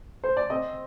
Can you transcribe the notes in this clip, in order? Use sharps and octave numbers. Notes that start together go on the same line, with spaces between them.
C5
D5
C4 D#5